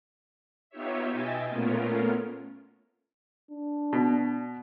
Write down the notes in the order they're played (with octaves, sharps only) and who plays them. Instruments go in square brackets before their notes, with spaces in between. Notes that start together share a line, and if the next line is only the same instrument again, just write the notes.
[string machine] B3 D#4 F4 G4 C#5 E5
B2 D#5 E5 G5 G#5 A6
A#2 A3 B3 C#4 F4 A#4
[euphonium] D4
[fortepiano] B2